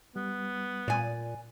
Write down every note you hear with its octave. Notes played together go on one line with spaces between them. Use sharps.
G3 B3
A#2 D5 G#5